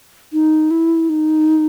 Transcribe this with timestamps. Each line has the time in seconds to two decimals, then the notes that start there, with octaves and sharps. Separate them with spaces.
0.32 D#4
0.71 E4
1.09 D#4